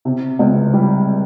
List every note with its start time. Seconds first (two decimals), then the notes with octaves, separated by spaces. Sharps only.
0.05 C3
0.39 C#2
0.73 G3